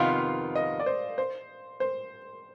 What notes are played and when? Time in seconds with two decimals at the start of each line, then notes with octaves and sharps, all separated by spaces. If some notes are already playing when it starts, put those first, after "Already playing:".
Already playing: F2 C3 D#3 B3 F4 F5
0.55 D#5
0.80 D5
0.86 C5
1.18 C5
1.80 C5